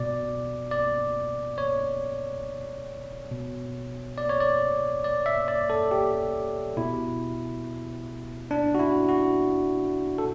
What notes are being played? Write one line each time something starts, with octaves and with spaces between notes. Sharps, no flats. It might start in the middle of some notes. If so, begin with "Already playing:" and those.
Already playing: B2 D5
D5
C#5
B2
D5
C#5
D5
D5
E5
D5
A4
G4
B2 E4
D4
F#4
E4
F#4
A4